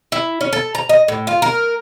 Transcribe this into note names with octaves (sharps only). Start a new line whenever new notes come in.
E4
C#4
A4
A#5
D#5
A2
F4
A#4